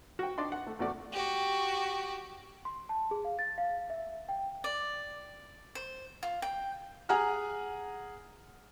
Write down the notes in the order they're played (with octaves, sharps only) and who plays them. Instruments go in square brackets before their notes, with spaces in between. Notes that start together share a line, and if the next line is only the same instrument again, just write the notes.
[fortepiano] F#4 G5
D4 D5 D#5 C6
F#5
A3
E2 A3 F#4 D5
[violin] F#4 G4
[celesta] C6
A5
G#4
F5
A6
F5
E5
G5
[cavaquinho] D5
C5
F4
G5
[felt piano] G#4 F#5 G#5 A#5 F6